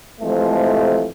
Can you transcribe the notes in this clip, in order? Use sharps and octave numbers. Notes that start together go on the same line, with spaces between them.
F2 C3 E3 F3 G#3 A3